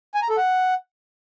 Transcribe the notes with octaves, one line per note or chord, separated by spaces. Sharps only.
G#5
A#5
A4
F#5